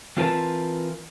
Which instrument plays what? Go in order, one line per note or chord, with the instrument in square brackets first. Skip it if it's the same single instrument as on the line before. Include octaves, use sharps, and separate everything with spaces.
[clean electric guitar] E3 C4 F4 A#4 B4 A5